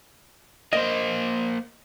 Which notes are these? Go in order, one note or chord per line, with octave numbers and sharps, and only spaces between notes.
A#3 C5 D#5